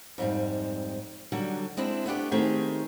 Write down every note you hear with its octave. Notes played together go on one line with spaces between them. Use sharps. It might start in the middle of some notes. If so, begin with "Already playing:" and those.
F2 G#2 G3
D3 F#3 G3
G#3 C4 D4 E4
A3 B3 D4 G4
D#3 A3 C4 G4 G#4